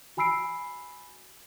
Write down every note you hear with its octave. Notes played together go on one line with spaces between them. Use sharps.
F#4 G#5 B5 E6 C7 D7